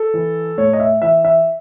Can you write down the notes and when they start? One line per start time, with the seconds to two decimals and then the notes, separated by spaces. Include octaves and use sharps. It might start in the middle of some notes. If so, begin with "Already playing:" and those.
Already playing: A4
0.14 E3
0.58 A2 C#5
0.73 D#5
0.80 E5
1.02 E3 E5
1.25 E5